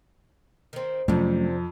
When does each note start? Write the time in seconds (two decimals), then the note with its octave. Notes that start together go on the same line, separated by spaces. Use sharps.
0.73 D#3 C4
1.08 F2 C3 F#3 A3 C#4 D4